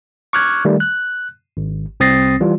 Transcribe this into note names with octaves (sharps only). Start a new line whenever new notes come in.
C#6 D6 F6 F#6 G#6
D#3 G3 A3
F#6
G#1
C2 C4 D#6 A6 A#6 C7
E3 G3 F4